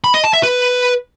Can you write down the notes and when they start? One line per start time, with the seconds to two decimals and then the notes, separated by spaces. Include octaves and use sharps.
0.04 B5
0.14 D#5
0.24 A5
0.33 E5
0.43 B4